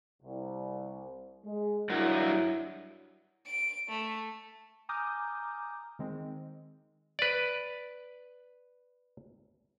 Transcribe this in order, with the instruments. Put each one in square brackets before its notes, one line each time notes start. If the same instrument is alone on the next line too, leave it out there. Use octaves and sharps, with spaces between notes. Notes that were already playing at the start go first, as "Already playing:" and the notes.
[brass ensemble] C2
G#3
[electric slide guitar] G2 F#4 A#4 [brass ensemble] F#3 E4
[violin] D7
A3
[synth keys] G#5 A#5 D6 D#6 F6 G6
D#3 G#3 C4
[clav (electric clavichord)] B4 D5